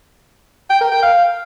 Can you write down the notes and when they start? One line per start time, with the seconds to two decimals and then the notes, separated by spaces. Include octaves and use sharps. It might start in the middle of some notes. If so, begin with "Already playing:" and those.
0.70 G5
0.81 A#4
0.92 G5
1.03 F5